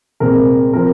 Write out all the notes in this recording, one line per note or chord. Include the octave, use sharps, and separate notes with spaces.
C2 A#2 G#3 C4 A#4
C3 F3 C4 A#4